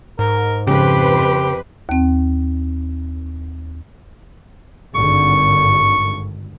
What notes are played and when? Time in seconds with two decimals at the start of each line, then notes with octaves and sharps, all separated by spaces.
0.19 G#2 A#4
0.67 F2 C#3 G4 B4 C5
1.89 D#2 C4
4.95 G#1 G2 D3 C#6